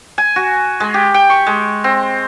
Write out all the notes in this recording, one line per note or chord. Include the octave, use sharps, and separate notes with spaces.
G#5
F#4
G#3
G4
G5
C#6
G#3
C4